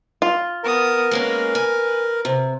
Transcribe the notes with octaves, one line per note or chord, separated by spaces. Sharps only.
F4
B3 A#4 D#6
G#3 A#3 C#4 B4
G#5
C3